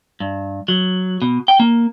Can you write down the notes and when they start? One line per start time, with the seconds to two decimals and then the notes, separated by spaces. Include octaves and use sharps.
0.20 G2
0.68 F#3
1.22 B2
1.48 G5
1.60 A#3